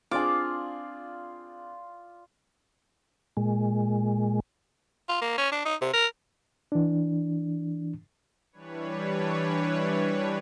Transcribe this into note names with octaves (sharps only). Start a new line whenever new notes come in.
C4 D4 F4 G#4 D5 D6
A#2 G#3
F4
A#3
C#4
D4
D#4
C3
A#4
E3 D4
E3 G3 D4 B4 C#5